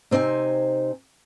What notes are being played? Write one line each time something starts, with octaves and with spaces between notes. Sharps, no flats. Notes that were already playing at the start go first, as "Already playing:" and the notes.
C3 C4 D#4 D#5 G#5